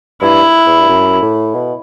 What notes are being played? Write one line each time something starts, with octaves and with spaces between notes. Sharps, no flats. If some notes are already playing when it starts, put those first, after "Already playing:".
G2 E4
E2
G2
F#2
A2
B2